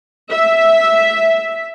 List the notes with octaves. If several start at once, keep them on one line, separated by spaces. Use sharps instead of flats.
E5